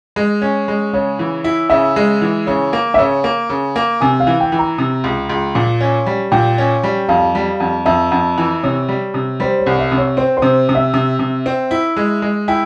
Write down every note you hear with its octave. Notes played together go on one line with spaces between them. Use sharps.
G#3
C#4
G#3
C#3 C#5
E3
E4
C#3 E5
G#3
E3
C#3 C#5
A#3
E5
C#3 C#5
A#3
C#3
A#3
C3 G#5
F5
E3
G5
E3
A#5
C3
C#2
C#2
A#2
C#4
G3
A#2 G5
C#4
G3
F2 F5
G3
F2
F2 E5
F2
E3
C3 C#5
G3
C3
G3 C5
C#5
C2
E5
C3
C#5
C4 C5
C5
C3
C3
E5
C3
C3
C4
E4
G#3
G#3
E4 G5